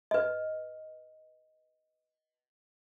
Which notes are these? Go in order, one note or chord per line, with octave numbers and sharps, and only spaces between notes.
B4 D#5